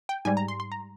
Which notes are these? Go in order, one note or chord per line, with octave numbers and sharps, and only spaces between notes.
G5
G#2 G3 G#5
A#5
C6
C6
A#5